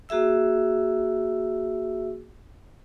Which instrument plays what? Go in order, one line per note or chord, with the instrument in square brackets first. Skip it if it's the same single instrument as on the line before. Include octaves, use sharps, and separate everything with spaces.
[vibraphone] A#3 F#4 G#4 E5 E6